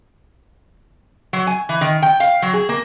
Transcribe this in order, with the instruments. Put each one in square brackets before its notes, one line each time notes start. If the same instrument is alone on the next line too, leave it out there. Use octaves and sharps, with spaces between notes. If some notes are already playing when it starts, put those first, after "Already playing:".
[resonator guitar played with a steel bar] F#3
G#5
E3
D#3
G5
F5
F#3
G#4
A#3